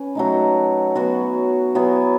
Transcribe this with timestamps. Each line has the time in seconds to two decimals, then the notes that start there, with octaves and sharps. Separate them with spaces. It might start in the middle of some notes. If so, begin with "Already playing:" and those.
Already playing: C#4 B4
0.15 F#3 A3 D#4
0.95 F#3 B3 F#4
1.75 F#3 B3 E4 G#4